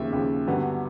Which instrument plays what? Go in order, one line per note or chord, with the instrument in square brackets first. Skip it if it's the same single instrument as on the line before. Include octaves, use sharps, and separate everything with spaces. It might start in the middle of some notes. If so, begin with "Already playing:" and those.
Already playing: [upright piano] D#2 C#3 F3 E5
D#2 C#3 F3
G2 D3 F#3 B3